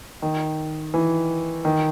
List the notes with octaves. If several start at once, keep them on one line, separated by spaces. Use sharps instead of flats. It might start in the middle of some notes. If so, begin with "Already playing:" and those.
D#3
E3
D#3